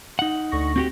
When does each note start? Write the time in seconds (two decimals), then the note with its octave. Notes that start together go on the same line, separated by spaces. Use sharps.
0.19 D#4 F#5
0.51 D2 C#6 A#6
0.76 C4 F#4 G4